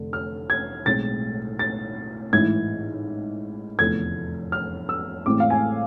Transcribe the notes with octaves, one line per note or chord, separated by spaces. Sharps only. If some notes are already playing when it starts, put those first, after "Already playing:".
Already playing: F1 D3
F6
G#6
B1 A2 G#3 C4 A6
A6
A1 G#2 E3 G#6
F1 E2 D3 F3 A3 G#6
F6
E6
A1 A2 E3 G#3 C4 D6
F5
G#5